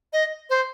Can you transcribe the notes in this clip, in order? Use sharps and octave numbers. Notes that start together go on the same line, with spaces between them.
D#5
C5